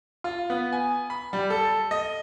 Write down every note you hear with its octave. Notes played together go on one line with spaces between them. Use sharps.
F4
B3
G#5
B5
G3
A4
D#5